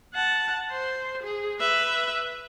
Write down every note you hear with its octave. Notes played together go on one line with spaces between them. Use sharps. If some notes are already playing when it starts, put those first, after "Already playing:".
F#5 A5
C5
G#4
B4 E5